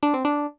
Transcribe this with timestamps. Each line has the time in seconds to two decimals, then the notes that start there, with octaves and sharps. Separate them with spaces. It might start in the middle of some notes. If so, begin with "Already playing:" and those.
0.03 D4
0.14 C4
0.25 D4